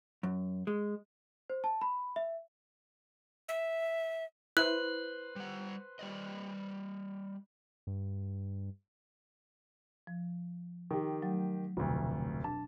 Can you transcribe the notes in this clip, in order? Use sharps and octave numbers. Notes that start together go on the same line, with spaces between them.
F#2
G#3
C5
A5
B5
E5
E5
E4 B4 C5 F#6
G3 F#5
G3 D5 D#5
G2
F3
D#3 G4
F#3 A3
F1 D2 B2
D4 A5